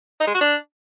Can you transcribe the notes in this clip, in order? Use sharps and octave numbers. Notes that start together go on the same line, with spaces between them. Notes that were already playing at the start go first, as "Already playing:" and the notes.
D#4
G#3
F#4
D4